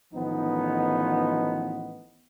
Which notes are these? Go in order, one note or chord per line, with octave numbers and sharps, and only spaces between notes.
A1 D#3 F3 B3 D#4